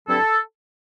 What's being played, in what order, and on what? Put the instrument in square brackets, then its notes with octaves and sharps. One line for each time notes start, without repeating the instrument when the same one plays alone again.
[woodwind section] G2 D3 F#3 C4 E4 A4